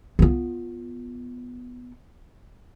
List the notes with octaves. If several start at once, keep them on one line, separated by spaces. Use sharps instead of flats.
B3 F4